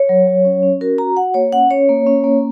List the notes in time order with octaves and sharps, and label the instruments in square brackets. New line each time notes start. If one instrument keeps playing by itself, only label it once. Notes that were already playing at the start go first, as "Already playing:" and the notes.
Already playing: [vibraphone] C#5
F#3
F#3
C#4
C#4
F#4 A#4
F#4 A#5
F#4 F#5
A#3 C#5
C#4 F#5
C#4 C#5
A#3
C#4
A#3